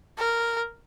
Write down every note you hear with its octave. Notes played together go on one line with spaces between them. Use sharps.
A#4